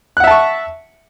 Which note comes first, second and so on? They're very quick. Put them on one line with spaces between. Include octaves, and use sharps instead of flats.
F#6 F#5 E5 A5 C#6